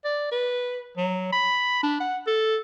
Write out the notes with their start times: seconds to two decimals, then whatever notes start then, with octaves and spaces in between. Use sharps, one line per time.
0.04 D5
0.31 B4
0.97 F#3
1.32 B5
1.83 D4
2.00 F#5
2.27 A4